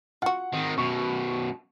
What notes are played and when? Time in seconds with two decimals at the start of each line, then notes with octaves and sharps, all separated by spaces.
0.22 F4 F#4 F#5
0.53 D#3 C4
0.78 F#2 B2 C#6